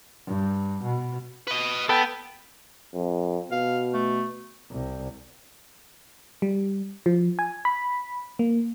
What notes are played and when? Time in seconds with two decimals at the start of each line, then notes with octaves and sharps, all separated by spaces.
0.27 G2
0.83 B2
1.48 B4 D#5
1.89 B3 A4 B4 G5
2.94 F2
3.51 B2 F5
3.94 A3
4.71 C2
6.42 G3
7.06 F3
7.39 G#5
7.65 B5
8.39 A#3